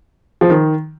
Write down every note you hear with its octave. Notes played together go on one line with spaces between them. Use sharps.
F3
D#3